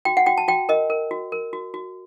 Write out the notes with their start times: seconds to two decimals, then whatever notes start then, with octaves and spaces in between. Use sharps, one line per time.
0.05 F#4 G5
0.17 F#5
0.26 F#4 G5
0.38 A5
0.48 F#4 G5
0.69 A#4 D#5
0.90 A#4
1.11 F#4
1.32 A#4
1.53 F#4
1.74 F#4